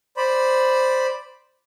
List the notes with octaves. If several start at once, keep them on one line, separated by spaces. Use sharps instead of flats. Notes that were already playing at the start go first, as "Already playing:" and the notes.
C5 D5 B5